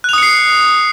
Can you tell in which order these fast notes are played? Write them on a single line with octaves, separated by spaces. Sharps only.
F#6 F7 D#6 C#7 C7